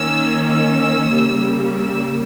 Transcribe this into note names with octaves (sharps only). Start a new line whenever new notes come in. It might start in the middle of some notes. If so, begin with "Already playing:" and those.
Already playing: D#3 A#3 C#4 E6
E6
C#3 G3 A#3
E6